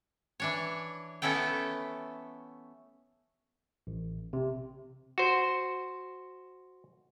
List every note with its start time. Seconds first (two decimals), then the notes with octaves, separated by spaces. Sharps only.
0.40 E3 D4 C#5
1.22 A3 B3 C#4 E4 A4 G5
3.87 A1
4.33 C3
5.18 F#4 C5